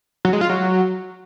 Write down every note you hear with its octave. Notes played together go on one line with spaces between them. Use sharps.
F#3
G#3
F4
F#3